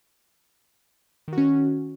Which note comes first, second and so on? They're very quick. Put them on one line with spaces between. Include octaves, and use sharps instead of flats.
D#3 F#4 C#4